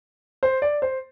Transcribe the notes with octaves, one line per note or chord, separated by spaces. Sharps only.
C5
D5
C5